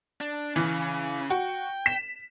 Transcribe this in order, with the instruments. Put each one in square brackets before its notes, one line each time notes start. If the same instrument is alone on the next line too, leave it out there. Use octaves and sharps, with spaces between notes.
[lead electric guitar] D4
[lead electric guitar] C#3 [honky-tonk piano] E3
[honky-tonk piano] F#4 [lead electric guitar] G5
[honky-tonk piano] B6 E7